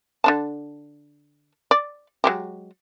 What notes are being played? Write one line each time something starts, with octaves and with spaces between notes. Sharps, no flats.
D3 D4 A5
D5
F#3 G#3 G4